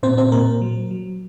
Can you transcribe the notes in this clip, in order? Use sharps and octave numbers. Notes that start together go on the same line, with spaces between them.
A#2 C4 C5
C4 C5
A#2 A#3 A#4
F#3
F#3